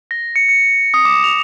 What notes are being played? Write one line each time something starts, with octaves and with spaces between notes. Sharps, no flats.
A#6
C#7
C#7
D#6
D6
F7